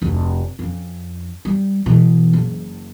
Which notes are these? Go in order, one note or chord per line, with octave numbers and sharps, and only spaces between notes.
F1 D2
F2 C#4
G3
B2 E3
F#1